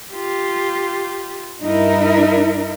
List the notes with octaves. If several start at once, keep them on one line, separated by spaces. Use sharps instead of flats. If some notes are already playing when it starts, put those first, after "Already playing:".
F4 G4
G2 D#4 E4 A#4